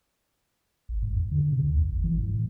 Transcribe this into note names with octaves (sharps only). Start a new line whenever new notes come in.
G#1
G#2
F2
D3
C3
D2
F2
G#1
E3
G#2
A2